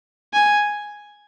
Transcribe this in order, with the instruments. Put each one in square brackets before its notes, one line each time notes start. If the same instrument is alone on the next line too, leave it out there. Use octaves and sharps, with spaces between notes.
[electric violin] G#5